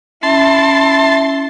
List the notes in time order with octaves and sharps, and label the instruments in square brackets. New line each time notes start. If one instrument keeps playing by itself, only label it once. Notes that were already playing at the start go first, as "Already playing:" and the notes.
[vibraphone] C#4 [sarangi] E4 [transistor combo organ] A5 C6